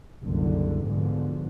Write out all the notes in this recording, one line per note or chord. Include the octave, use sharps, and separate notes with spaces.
F#1 C2 D3
G#2 B2 D3 F3